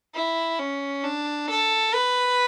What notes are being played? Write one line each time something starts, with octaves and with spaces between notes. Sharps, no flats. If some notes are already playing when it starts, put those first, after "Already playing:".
E4
C#4
D4
A4
B4